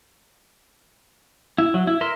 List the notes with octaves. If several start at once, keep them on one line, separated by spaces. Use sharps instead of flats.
E4
F#3
E4
A#4 E5 C6